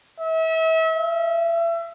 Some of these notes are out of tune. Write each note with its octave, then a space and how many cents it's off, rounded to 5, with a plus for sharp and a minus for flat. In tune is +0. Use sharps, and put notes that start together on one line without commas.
E5 -35
E5 +35